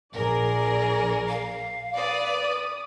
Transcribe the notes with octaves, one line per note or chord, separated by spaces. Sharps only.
A#1 G#4 A#4 D5
F5
B4 D5 D6 D#6